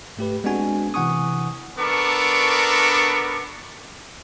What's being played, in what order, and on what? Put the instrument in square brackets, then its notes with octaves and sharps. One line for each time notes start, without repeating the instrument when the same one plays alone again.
[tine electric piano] G#2 A3 G4 B4
G#3 B3 C4 D4 F#4 G#5
C3 E3 F#5 G#5 C#6 D#6
[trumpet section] B3 D4 A4 A#4 C#6 D6